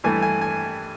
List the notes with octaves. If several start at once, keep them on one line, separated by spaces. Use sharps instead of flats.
G2 E3 A3 G#5
G#5
G#5